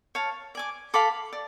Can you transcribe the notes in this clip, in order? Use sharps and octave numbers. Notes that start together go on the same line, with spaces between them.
C#5 F5 A5
D5 G#5 D6
A4 F5 B5 D6
D5